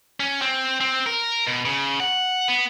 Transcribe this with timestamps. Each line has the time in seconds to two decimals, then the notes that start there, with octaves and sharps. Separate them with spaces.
0.20 C#4
0.42 C4
0.81 C4
1.06 A#4
1.47 B2
1.65 C#3
2.00 F#5
2.48 B3